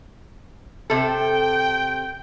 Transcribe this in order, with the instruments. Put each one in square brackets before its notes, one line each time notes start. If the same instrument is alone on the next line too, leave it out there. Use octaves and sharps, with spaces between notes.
[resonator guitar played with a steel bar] C3 A4 [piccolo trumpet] G5